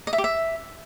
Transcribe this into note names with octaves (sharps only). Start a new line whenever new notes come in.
D#5
E5
G4
E5